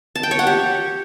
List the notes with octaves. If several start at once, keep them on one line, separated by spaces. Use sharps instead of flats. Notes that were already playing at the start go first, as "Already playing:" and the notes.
A5
G5
C#5
F#5
G4